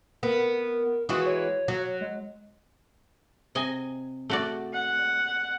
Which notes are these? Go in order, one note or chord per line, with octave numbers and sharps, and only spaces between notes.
B3 A#4
E3 G#3 F#4 D#6
C#5
F#3
G#3
C3 D#5 G#5
A3 F#4 D5
F#5